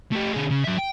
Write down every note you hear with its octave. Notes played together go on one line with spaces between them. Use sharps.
A3 G4
D3 G#4
C#3
F#3 E5
G5